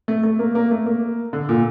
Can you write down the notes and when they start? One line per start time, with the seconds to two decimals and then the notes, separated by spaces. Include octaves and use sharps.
0.08 A3
0.23 A3
0.39 A#3
0.55 A#3
0.71 A3
0.86 A#3
1.33 D3
1.49 A#2